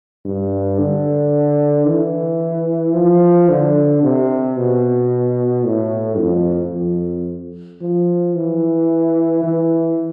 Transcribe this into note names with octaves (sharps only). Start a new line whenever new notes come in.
G2
D3
E3
F3
D3
C3
B2
A2
F2
F2
F3
E3
E3